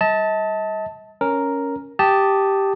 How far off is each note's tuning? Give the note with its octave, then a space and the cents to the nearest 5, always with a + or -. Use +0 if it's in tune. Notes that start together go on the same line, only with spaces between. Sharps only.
G3 +0 D#5 +45 A5 +0
C#4 +0 A#4 +0
G4 -5 A5 +0 D#6 +0